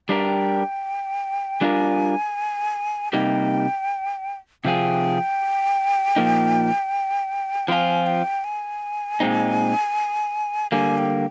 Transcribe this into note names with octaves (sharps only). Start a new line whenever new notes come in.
G3 D4 G4 A#4 G5
G3 D4 F4 A#4 G#5
C3 G3 A#3 D#4 G5
C3 F3 C4 F4 G#4 G5
A#2 F3 A#3 D#4
F3 C4 F4 G#5 C6
G5
G#5
A#2 G#3 C4 D#4
D3 G3 A#3 G#5
G5